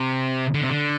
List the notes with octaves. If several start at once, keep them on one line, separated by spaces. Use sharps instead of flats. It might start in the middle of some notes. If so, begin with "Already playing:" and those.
Already playing: C3
D3
C3
D3